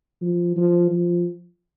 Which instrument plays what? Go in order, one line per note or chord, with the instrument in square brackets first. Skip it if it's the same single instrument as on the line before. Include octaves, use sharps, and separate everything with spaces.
[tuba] F3
F3
F3